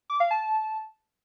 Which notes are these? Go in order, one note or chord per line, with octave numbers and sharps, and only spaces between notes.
D6
F5
A5